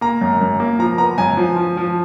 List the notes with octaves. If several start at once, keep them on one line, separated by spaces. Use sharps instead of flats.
A#3 A#5
F#2
F#2
A#3
F3 A#5
B3 A#5
F#2 G#5
F3
F3
F3